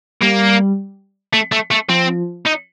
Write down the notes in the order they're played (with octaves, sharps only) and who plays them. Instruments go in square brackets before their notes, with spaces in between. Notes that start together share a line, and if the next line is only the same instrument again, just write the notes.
[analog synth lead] G3 [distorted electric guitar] A#3
[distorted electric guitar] A3
A3
A3
[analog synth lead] F3 [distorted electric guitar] C4
[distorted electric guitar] D#4